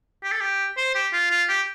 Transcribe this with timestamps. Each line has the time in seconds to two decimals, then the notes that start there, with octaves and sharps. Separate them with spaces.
0.23 G4
0.32 A4
0.41 G4
0.77 C5
0.95 G4
1.13 F4
1.31 F4
1.49 G4